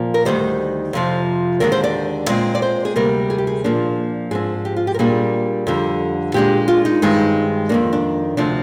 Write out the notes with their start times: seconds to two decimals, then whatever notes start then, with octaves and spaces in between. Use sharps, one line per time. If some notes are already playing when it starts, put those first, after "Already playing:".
Already playing: A#2 F3 A#3
0.14 A#4
0.25 D2 C3 D#3 G3 C5
0.93 F2 C3 F3
1.60 D#2 D3 G#3 A#4
1.72 C5
1.84 D5
2.29 A#2 G#3 C4
2.55 D5
2.62 C5
2.85 G#4
2.96 D2 C3 G3 A#3 A#4
3.30 G#4
3.38 G4
3.47 G#4
3.64 A#2 F3 A#3 D4
4.31 G#2 F3 C4 G#4
4.65 G4
4.76 F4
4.87 G4
4.94 A#4
4.99 A#2 G3 A#3 D4 G#4
5.67 F2 D3 G3
6.34 A#2 G#3 D4 G4
6.68 F4
6.85 D#4
7.02 G2 D#3 G#3 C4
7.69 F2 D#3 A#3 D4
7.93 D4
8.37 D2 C3 F3 C4 D4